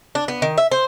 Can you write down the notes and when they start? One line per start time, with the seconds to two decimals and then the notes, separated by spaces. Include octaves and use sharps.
0.15 D4
0.28 B3
0.42 D#3
0.58 E5
0.71 C5